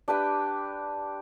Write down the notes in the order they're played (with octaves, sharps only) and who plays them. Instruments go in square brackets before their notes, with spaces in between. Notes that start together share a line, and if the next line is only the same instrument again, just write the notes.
[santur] D4 G4 B4 G5